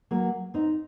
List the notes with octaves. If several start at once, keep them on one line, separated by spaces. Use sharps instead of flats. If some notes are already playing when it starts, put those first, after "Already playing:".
F#3 A#3
C4 D#4